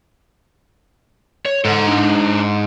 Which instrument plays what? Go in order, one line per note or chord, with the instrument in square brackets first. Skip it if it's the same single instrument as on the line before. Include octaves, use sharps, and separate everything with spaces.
[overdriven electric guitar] C#5
[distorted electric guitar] G#2 [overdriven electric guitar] A4 F#5
[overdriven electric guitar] D4 D#4